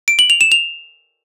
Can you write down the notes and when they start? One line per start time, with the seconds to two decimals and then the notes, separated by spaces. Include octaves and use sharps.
0.08 D7
0.19 F#7
0.30 F7
0.41 E7
0.52 F7